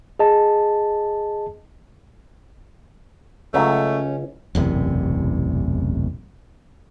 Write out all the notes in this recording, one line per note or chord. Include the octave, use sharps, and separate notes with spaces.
G#4 D#5 A5
C#2 F#3 A3 C#4
E1 A1 F#2 C3